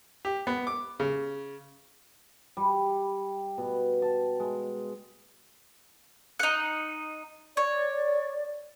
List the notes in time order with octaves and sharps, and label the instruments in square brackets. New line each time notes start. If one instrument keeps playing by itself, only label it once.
[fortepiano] G4
B3
D6
C#3
[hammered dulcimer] G3
B2
A5
G#3
[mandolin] D#4 F#5
[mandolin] C#5 [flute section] D5